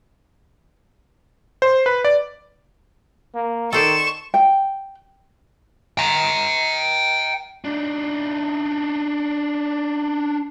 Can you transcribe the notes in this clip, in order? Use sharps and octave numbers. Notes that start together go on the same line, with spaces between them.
C5
B4
D5
A#3
D#3 A4 C5 D5 C#6 E7
G5
G5 A#5
D4 D#4